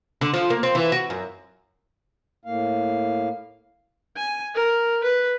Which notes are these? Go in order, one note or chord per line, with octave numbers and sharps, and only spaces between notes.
D3
F3
A#3
C4
E3
F#4
F#2
A2 A#3 F5
G#5
A#4
B4